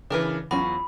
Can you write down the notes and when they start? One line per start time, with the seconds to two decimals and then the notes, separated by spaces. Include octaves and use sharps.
0.10 C#3 E3 D4 A#4 B4
0.51 E2 F#3 C#4 F4 B5